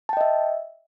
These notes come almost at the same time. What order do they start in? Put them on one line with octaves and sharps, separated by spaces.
A5 G5 D#5 E5